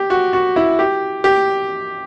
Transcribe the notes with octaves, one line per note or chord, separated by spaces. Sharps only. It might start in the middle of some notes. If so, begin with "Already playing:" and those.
Already playing: G4
F#4
F#4
E4
G4
G4